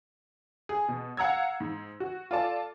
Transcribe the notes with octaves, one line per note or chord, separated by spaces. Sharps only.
G#4
B2
F5 F#5 A#5 E6 G#6
G#2
F#4
F4 A4 D5 A5